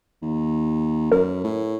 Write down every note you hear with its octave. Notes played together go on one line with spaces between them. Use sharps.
D#2
F#2 A#4
A2